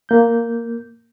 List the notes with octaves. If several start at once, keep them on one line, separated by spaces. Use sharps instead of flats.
A#3 G6